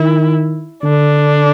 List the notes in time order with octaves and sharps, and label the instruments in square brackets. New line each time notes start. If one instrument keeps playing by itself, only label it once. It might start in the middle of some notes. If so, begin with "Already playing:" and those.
Already playing: [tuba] D#3 [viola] E4
[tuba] D3 [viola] D4